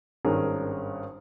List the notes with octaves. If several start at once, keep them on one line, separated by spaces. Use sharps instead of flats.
G#1 G2 C#4 G#4 A#4